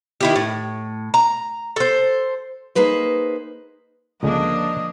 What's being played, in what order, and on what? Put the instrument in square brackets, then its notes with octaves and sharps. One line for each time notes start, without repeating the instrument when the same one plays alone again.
[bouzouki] D#3 E4 G4
A2
A#5
A4 C5
[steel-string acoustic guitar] A#3 D#4 G#4 B4 C5
[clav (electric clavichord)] C#2 D3 G#3 [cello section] F3 A#3 D4 [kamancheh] D#5